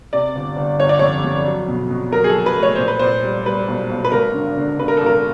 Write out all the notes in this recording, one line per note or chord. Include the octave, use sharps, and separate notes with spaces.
C3 D5
G1
G1
G1 C#5
D5
F2 C#5
F2
F#3
B2
B2
F#3 A#4
G#4
F#3 A4
B4
A3
C#5
A#2 C5
B4
A#2 C5
G3
G3 B4
B1
B1
B4
G#1 A#4
D3
D3
D3 B4
A#4
G#1 A4
A#4